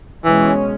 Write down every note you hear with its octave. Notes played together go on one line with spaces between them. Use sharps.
B2 E3 G#3 C#4